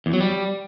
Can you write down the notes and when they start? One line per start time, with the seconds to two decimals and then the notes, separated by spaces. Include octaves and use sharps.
0.06 E2
0.13 F#3
0.20 G3